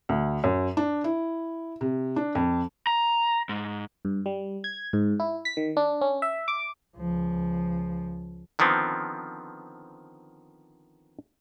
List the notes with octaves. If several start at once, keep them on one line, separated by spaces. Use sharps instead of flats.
D2
F#2
D4
E4
C3
D4
F2
A#5
G#2
G2
G3
G#6
G#2
E4
B6
D#3
D4
C#4
E5
D6
C#2 F3
D3 D#3 F3 B3 C4